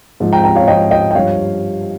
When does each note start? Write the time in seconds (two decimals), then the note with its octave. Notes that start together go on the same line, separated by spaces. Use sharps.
0.20 G#2 F3
0.32 G5 A#5
0.44 G5 A#5
0.56 C#5 F5
0.67 G#2 F3 D#5 G5
0.91 D#5 G5
1.11 G5
1.15 G2 F3 C#5 F5